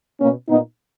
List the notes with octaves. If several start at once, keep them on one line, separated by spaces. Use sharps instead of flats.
B2 A#3 C#4
A#2 B3 D#4